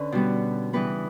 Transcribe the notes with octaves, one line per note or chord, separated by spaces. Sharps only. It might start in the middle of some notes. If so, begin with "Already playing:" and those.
Already playing: D3 C#4 B4
B2 G3 B3
C#3 E3 G3 B3 B4